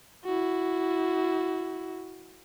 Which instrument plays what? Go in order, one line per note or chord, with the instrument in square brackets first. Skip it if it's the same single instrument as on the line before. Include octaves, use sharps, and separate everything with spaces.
[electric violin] E4 F#4